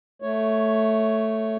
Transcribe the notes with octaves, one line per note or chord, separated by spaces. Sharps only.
A3 C#5